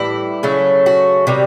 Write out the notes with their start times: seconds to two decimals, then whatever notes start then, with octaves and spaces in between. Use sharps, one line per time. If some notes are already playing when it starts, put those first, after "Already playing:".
Already playing: A2 E3 G3 E4
0.43 C#3 F#3 A3
0.86 F#4
1.27 C3 D#3 G3